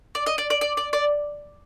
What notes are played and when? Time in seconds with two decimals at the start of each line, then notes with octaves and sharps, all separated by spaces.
0.15 D5
0.26 D#5
0.38 D5
0.50 D5
0.61 D5
0.77 D5
0.93 D5